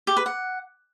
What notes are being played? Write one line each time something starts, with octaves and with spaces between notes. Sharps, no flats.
G4
B4
F#5